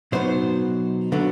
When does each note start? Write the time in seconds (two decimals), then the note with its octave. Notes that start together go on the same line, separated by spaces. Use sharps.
0.12 B2 F#3 B3 D#4 C5
1.12 D3 F#3 B3